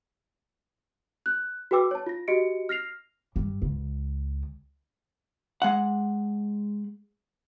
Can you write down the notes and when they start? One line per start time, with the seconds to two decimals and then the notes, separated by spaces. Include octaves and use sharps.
1.26 F#6
1.71 F#4 G#4 B4 G5 D6 E6
1.91 C#5 A5
2.06 F4 A#6
2.28 F#4 G4 D#5 C#7 D7
2.69 F6 A#6 C7 F7
3.36 G2
3.62 C#2
5.62 G#3 F#5